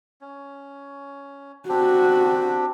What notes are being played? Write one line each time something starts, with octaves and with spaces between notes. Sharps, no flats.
C#4
C4 D4 F#4 G4